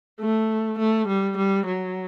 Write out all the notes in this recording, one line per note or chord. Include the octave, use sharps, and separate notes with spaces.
A3
A3
G3
G3
F#3